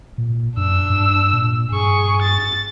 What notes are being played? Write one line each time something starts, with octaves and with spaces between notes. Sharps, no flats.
A#2
F#2 D4 E6
G2
A#2
G2 G#4 C#6
A6